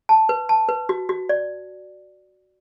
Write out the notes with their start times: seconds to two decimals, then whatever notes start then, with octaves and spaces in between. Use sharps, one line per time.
0.09 A5
0.29 B4
0.49 A5
0.69 B4
0.89 F#4
1.09 F#4
1.29 D5